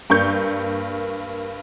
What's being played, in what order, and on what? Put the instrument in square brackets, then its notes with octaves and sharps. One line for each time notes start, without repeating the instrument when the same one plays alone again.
[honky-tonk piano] G2 A#3 C#6 G6